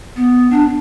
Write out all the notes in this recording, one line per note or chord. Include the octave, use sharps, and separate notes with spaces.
B3
D4